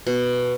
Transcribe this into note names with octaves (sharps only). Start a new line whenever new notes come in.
B2